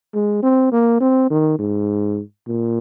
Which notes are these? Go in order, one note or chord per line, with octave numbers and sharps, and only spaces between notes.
G#3
C4
A#3
C4
D#3
G#2
A#2